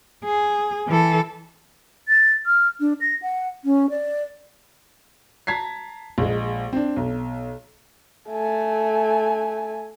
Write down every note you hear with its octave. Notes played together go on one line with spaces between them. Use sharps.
G#4
E3 A4
A6
F6
D4
A#6
F#5
C#4
D5
A5 A#5 G#6 B6 C7
A#1 G#3
C4 D4
B1
A3 G#5